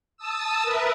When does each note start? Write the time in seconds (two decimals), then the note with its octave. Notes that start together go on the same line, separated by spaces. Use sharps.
0.17 A5 D#6 E6
0.62 A#4 B4 E5